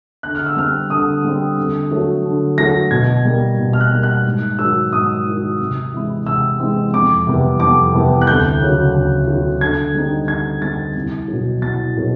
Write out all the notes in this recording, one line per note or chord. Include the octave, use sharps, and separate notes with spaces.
D3 F#6
F6
E6
G3 C4 F6
D3 D#6
G3 C4
D3
F#3 A3
D3
F#3 A3 A#6
B2 G#6
G3 A#3
B2
F6
F#6
G3 A#3
F#6
G#2
D#3 F#3 E6
G#2 D#6
D#3 F#3
C3
E3 G#3 C4 E4
C3 E6
E3 G#3 C4 E4
F2 D6
C3 E3 G3 B3
F2 D6
C3 E3 G3 B3
F#6
D2 G6
C#3 F#3
D2
C#3 F#3
D3 G#6
G3 C4 D#4
D3 G#6
G3 C4 D#4 A6
C2
B2 F#3
C2 A6
B2 F#3